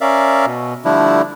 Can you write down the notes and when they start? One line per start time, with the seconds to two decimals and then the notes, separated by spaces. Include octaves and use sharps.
0.01 C#4 A#4 D5 E5 F5
0.46 B2
0.85 D3 F3 G3 A3 D4 E4